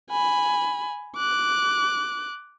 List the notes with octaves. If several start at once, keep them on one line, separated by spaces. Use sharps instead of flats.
G#5 B5
D6 F#6